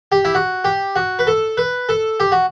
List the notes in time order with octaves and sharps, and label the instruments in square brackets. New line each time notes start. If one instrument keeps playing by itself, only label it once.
[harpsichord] G4
E4
F#4
G4
F#4
B4
A4
B4
A4
G4
F#4